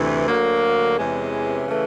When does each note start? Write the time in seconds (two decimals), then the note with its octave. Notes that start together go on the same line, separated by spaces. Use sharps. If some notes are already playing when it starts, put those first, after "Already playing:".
Already playing: D2 C3 E3
0.28 D2 D3 F#3 A#3
0.98 E2 C3 E3 G#3 C#4
1.67 C#3 E3 A3